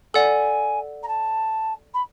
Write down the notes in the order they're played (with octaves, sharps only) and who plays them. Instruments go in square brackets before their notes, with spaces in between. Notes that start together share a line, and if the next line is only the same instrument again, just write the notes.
[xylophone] A4 D5 F#5 [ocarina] G#5
[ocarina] A#5
A5
B5